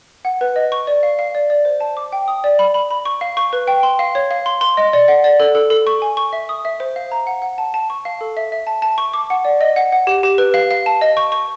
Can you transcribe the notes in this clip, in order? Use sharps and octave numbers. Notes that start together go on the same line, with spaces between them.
F#5
B4
D#5
C#6
D5
F5
F5
D5
D5
C5
A5
D6
G5
D#6
D5
B5
B5
B5
C#6
F5
C#6
B4
G5
C6
F5
C#5
F5
C6
C6
D#5
D5
F#5
D5
A4
A4
A4
C#6
G#5
C#6
E5
D#6
E5
C5
F5
A#5
F#5
F#5
A5
A5
C#6
F5
A4
E5
E5
A5
A5
C#6
D6
F#5
D5
D#5
F#5
F#5
G4
G4
B4
F5
F5
A5
D#5
C#6
C#6